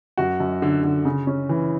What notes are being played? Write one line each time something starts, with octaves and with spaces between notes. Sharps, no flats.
F#2 F#4
F#2
D3
D3
C#3
C#4
E3